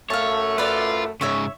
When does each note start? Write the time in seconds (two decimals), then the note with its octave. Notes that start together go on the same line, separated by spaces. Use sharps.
0.10 F#2 A3 C#5 F5 A5
0.58 F4 B4 D5
1.21 G#2 C#3 C#5 E5 C#6